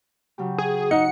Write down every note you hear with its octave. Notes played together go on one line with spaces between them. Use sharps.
C#3 F#3 G4
G#4
D#4 F#5 C#7